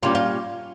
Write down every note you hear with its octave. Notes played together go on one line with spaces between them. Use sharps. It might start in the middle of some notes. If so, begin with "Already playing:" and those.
A#2 G3 A#3 C#4 F4 G4
F4